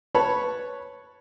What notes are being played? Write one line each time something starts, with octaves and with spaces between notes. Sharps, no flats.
B4 C#5 A5 B5